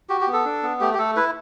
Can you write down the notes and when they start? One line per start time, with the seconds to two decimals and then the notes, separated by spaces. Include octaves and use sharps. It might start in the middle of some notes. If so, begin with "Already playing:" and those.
0.09 F#4 G4
0.21 G4
0.28 B3
0.33 A4
0.45 D4
0.63 B3
0.81 A3 G4
0.94 G4
0.98 A3 A4
1.16 E4 B4